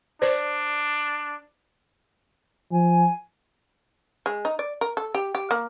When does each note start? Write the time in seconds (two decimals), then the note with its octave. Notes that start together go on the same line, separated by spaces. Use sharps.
0.22 D4 C5 D5
2.71 F3 G#5
4.26 G#3
4.45 D#4
4.59 D5
4.81 A#4
4.97 A4
5.15 G4
5.35 G4
5.51 A#3